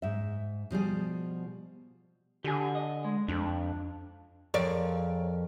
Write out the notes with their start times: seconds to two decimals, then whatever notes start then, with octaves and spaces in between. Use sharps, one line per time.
0.02 G#2 E5
0.71 B2 F3 G3 G#4
2.44 D3 G4 G#5
2.75 D#5
3.05 G#3
3.28 F2 D4
4.54 F2 G#4 A#4 C#5 D5